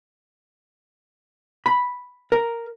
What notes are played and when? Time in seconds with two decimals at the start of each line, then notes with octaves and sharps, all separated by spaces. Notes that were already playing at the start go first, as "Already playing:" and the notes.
1.66 B5
2.32 A#4